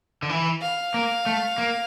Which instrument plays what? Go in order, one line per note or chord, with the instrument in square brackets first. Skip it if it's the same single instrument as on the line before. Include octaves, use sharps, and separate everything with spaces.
[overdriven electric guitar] D3
E3
[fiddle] F5
[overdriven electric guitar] A#3
A3
A#3